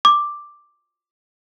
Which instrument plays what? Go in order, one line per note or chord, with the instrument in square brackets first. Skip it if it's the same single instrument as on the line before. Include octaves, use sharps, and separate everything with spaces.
[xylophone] D6